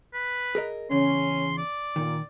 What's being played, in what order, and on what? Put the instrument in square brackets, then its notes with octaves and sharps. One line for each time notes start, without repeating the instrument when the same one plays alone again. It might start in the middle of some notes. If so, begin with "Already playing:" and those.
[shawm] B4
[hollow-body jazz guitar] G#4 A#4 D#5
[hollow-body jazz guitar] E2 C#3 [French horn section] C#4 [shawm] C6
[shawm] D5
[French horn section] A#2 [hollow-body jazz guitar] D#3